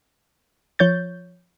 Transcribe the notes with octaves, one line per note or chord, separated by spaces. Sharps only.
F3 C#5 G6 A6